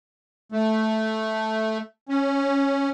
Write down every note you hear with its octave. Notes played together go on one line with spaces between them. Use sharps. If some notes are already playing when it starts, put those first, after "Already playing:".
A3
C#4